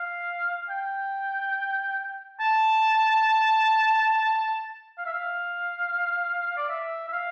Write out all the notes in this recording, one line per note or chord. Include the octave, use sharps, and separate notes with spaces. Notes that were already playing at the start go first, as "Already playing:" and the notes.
Already playing: F5
G5
A5
F5
E5
F5
D5
E5
E5
F5